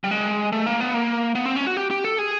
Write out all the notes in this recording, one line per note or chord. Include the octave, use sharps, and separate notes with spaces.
G3
G#3
A3
A#3
B3
A#3
B3
C4
C#4
F#4
G4
G4
A4
G#4